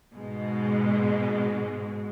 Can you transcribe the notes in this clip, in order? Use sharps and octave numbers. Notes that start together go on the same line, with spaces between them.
G#2 B2 G#3